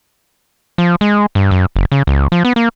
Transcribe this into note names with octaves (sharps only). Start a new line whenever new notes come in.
F3
G#3
G2
F#2
F#1
C#3
C#2
F3
B3
A#3